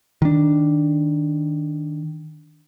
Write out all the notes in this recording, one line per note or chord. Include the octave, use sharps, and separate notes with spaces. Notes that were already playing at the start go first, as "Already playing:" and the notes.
D#3 D4